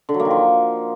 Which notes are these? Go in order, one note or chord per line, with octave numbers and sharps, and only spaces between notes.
D3
F#3
A#3
D#3
F3